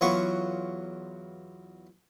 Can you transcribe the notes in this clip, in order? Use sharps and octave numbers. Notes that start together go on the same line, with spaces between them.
E2 F#3 B3 F4 C#6